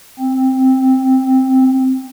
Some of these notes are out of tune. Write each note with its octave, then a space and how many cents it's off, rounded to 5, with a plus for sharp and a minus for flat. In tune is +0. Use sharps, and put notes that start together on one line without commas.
C4 +5